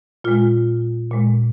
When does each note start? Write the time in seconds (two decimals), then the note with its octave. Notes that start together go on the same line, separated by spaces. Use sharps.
0.24 A#2 G#3 F4
1.11 A#2 G#3